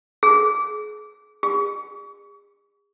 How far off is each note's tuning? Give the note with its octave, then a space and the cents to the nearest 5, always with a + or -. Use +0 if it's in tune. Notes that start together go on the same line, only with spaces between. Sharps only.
G#4 +30
G#4 -35